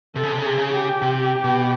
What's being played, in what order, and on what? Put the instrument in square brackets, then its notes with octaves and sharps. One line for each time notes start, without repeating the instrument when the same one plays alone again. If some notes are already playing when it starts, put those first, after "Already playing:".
[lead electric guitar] C3 [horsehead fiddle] A4
[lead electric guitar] C#3
C3
C#3
[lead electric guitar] C3 [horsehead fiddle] G#4
[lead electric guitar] C#3
[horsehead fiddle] G4
[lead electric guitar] C3
B2